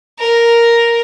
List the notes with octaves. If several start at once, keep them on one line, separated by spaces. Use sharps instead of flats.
A#4